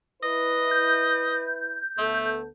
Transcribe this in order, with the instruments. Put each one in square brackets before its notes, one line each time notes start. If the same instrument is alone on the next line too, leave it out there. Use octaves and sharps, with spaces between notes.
[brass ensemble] E4 B4 [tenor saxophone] D#5
[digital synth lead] G6
[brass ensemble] D2 B3 A4 [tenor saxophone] A3